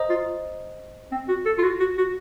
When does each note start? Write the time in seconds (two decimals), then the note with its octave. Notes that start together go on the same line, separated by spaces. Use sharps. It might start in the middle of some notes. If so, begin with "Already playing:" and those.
Already playing: C5 D#5 A#5 D#6
0.10 F4
1.12 C4
1.29 F#4
1.46 A4
1.58 F4
1.63 F#4
1.80 F#4
1.98 F#4